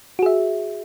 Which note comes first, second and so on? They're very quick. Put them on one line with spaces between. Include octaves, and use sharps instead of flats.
F#4 G#4 E5